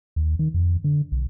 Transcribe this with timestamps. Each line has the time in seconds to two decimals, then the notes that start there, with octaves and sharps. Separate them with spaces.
0.16 D#2
0.39 D#3
0.54 F2
0.84 D3
1.12 B1